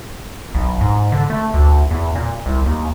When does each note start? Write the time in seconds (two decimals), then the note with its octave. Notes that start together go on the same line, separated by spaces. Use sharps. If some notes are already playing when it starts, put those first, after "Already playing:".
0.55 B1
0.81 G#2
1.12 D3
1.30 A3
1.54 D2
1.91 E2
2.15 A#2
2.46 C2
2.66 D#2